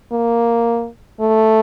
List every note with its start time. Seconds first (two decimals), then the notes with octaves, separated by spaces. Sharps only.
0.12 A#3
1.20 A3